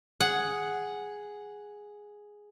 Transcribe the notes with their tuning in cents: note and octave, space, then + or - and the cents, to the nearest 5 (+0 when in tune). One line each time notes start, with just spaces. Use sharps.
G#4 +0 F#5 +0